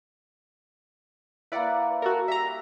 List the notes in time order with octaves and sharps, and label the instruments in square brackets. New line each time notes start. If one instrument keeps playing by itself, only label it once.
[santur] A#3 E4 [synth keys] B4 D5 F#5
[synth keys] F#4 A4 A#4
[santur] G3 [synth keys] E5 A#5